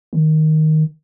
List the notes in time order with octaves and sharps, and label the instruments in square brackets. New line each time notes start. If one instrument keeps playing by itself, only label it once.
[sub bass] D#3